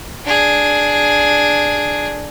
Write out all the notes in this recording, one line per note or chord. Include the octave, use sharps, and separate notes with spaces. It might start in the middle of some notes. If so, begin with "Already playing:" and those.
D4 G#4